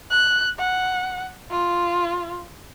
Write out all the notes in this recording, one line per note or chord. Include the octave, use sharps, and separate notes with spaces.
F#6
F#5
F4